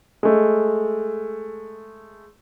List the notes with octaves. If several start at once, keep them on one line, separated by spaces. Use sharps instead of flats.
G#3 A3